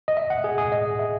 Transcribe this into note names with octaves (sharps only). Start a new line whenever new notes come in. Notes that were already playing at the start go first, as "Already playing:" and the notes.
D#5
E5
F#5
G#4
G#4
D#5
E5